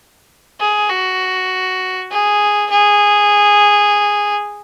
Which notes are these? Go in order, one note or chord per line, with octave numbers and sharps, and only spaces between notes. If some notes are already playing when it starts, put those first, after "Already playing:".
G#4
F#4
G#4
G#4